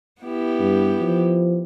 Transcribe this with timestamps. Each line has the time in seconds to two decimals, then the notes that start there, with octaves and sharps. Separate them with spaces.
0.22 B3 E4 G4
0.60 G2
1.01 F3